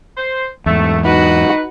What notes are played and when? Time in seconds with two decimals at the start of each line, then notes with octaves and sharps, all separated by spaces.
0.18 C5
0.66 E2 G#2 A3
1.05 D#4 F#4 B4